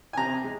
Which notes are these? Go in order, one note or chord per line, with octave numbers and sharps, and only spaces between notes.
G#5
C3 A#5
G#3